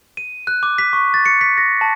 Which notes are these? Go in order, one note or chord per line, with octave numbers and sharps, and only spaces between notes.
D#7
F#6
D6
B6
C#6
A6
C#7
B6
A#6
A5